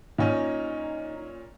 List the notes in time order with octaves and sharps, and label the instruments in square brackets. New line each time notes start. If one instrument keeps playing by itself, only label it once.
[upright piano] A#2 C#4 [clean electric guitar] D#4